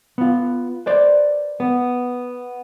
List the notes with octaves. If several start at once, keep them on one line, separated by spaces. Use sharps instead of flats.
B3 F4
B4 C5 D5
B3